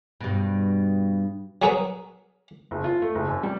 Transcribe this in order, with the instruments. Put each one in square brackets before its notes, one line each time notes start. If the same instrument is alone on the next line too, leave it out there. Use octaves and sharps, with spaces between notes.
[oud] G2 B2
[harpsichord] F#3 F#4 G#4 A#4 B4
[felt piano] F#1
F4
A3
F#1
F#2
G3